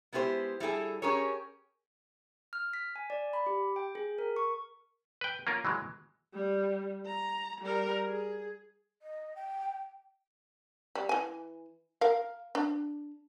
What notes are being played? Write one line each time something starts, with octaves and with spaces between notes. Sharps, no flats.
G#3 B3 E4 G4 C5
G3 E4 G#4 A4
C#4 G4 G#4 A#4 C#5
F6
B6
G#5
D5
B5
G4
G5
G#4
A#4
C#6
B4 G5
A#3 C#4 F4 A#4
E3 F#3 G#3
G3
A#5
G3 A#4
G#4
D#5
G5
G3
E3 G#5
A#4 F5
D4